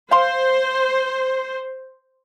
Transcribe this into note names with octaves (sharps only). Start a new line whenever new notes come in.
C5 F5 C6